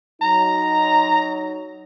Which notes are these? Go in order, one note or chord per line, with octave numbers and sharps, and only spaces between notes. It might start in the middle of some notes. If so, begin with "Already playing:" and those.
F#3 D#4 A#5